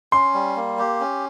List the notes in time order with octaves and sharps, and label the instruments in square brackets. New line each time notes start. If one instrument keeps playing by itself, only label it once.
[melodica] C#4 [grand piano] C6
[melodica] G3
A#3
G4
C#4